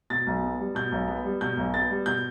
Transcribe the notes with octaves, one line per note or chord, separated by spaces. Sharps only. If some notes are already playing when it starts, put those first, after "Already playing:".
B2 A6
B1
B3
G3
B2 G6
B1
B3
G3
B2 G6
B1
B3 A6
G3
B2 G6